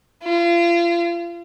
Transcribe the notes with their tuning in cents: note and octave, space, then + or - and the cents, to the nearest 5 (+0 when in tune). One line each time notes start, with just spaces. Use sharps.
F4 -35